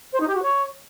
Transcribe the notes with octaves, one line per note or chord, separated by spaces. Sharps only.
C5
D#4
G4
F#4
C#5